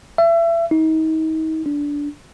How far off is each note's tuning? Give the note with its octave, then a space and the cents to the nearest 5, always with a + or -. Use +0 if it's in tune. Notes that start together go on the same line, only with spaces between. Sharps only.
E5 +30
D#4 +35
D4 -15